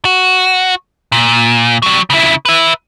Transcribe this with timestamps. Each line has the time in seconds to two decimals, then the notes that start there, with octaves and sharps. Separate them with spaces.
0.05 F#4
1.12 A#2
1.82 F#3 G3
2.10 C#3 E4
2.45 B4 E5